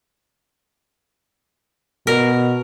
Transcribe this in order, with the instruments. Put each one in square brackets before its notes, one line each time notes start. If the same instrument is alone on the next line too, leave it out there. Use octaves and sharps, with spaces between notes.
[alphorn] B2 [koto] A#4